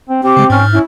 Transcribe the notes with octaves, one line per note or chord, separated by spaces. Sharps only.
C4
C4 G4
C#3 G#3
G#2 C#4 F6
C#4 E4